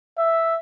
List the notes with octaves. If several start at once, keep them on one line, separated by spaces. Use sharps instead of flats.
E5